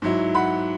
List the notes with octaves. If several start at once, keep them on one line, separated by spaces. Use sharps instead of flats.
G#2 F#3 E4
F#5 B5